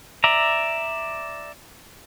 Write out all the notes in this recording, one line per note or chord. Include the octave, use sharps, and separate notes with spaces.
D5 E5 A#5